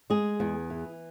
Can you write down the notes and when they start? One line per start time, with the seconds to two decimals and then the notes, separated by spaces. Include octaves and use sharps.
0.10 G#3 G#4
0.40 E2
0.70 E3